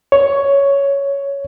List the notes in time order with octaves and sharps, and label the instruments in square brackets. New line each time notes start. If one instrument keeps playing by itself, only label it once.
[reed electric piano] C#5